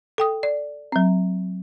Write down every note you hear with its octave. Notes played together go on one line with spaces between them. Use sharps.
A4 G5 D#6
D5
F#3 C4